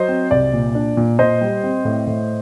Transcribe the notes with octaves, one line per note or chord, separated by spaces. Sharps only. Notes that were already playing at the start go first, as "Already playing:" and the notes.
Already playing: F#3 C5 D#5
C4
C2 D5
A#2
D4
A#2
A#2 C5 D#5
G3
C4
A2
A2